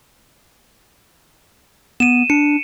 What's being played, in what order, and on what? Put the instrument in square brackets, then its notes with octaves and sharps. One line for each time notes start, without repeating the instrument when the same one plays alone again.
[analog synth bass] B3 [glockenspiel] D#7 E7
[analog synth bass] D4 [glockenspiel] C#7